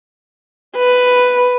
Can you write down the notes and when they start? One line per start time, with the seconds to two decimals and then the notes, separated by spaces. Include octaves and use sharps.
0.77 B4